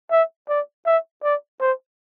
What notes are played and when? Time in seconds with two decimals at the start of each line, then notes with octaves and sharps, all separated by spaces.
0.11 E5
0.49 D5
0.86 E5
1.23 D5
1.60 C5